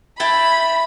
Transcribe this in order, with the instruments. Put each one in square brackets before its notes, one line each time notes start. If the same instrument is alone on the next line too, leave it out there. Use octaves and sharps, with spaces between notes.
[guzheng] E4 G5 A5 [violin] B5